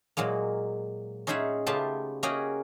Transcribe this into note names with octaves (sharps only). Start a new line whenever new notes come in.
A#2 F#3 G#3 A#3
C#4 D#4 F4 G#4 E5 F#5
C#3 A3 B3 F4 G4 A5
A#3 C#4 F#4 G#4 D#5 G5